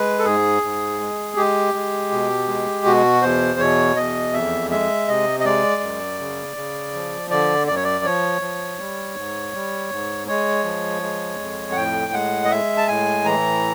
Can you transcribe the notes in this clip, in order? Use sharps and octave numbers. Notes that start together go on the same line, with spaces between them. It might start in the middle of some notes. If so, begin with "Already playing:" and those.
Already playing: G#3 B4
A4
G#2 G#4
G#2
G#3
G#3 G4
G#3
B2
G#3
B2 F#4
E2 C5
B2 C#5
E2 D#5
F2 E5
G#3 E5
C3 D#5
D#5
G#3 D5
F#2
C#3
C#3
F3
D3 D5
F#2 D5
C#5
D5
F3 C#5
F3
G3
G#2
G3
G#2
G#3 C#5
F3
G#3
F2
F#5
A2 G5
G#3 F#5
D#5
G#3 E5
A5
A2 G#5
E3 A#5